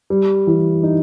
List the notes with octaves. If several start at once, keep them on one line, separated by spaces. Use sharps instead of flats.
G3
E3
D#4